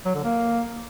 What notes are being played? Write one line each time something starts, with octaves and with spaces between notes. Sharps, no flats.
F#3
D3
A#3